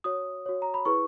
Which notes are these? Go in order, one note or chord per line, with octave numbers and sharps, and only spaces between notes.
F#4 C#5 D#6
F#4 C#5
A#5
B5
E4 G#4 B4 C#6